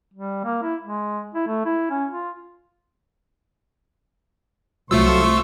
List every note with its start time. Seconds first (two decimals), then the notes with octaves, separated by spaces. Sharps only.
0.14 G3
0.44 A#3
0.63 E4
0.82 G#3
1.35 E4
1.47 A3
1.65 E4
1.90 C#4
2.11 F4
4.91 C2 F#3 A3 F4 C5 C#6 E6